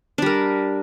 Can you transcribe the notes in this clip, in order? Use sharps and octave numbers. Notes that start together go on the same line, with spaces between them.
G3 D4 A#4